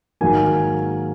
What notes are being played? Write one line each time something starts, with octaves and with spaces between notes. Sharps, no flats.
G#2 D#3 F#3 A#3 G#5